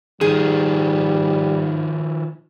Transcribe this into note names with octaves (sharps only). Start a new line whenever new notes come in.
G#2 D#3 F3 G3 G#4